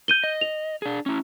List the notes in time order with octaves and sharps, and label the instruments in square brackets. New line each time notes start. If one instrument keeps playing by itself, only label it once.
[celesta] G6 D#7 G7
[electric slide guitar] D#5
[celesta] F7
[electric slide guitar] D4 G#4
C#4 E4